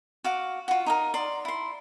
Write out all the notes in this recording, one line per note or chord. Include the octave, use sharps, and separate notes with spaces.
F#4 F5 D6
F4 F#4
D#4 G4 A#4
D5 C6
E4 C6